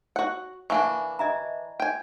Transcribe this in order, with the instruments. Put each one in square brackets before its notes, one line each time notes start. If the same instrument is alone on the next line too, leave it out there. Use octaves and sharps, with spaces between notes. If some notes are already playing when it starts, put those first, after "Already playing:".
[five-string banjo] F#4 F#5 [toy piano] C#5
[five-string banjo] E3 A#3 D4 [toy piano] E5 G#5 C#6
[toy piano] D#5 E5 A#5
[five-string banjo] G5 G#5